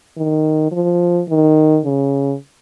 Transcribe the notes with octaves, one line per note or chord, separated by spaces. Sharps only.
D#3
F3
D#3
C#3